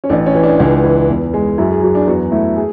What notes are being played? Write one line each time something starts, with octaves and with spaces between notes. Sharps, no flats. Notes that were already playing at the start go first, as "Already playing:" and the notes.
C#4
A1 D4
C#4
E3
D4
C#2 D4
E3
E2
G#3
F#2 E4
G#4
F#3 G#4
D4
E2 F#4
A3 E4
G#4